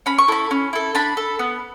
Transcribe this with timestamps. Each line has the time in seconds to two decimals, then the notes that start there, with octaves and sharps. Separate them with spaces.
0.06 C#4 B5
0.18 C#6
0.28 E4 A4 B5
0.51 C#4
0.73 E4 A4
0.95 D4 B5
1.17 A4
1.39 B3